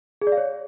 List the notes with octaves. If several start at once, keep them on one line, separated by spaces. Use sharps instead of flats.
G#4
D5
F5
C#5